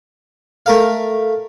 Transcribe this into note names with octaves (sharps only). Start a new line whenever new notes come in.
A3 A#4 F5